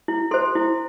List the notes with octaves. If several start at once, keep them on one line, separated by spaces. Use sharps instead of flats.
E4
A4 C5 C6
E4